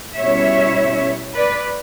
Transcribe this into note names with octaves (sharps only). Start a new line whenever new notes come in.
B2 G3 C#4 E4 C#5 E5
B4 D5